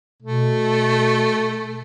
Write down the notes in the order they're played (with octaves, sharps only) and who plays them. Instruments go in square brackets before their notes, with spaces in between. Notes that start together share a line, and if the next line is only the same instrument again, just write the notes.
[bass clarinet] B2 [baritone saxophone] A3